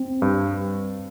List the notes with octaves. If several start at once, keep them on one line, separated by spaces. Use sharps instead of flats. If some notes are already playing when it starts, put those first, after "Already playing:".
Already playing: C4
G2